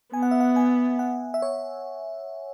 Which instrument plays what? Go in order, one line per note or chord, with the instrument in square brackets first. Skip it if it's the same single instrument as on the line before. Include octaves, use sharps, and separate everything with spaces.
[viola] B3 [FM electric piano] G#5
[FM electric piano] F#5
E5
F#5
G#5
F#5
E5
C#5